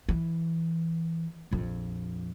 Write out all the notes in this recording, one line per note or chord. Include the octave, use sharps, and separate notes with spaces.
E3
A#1 F2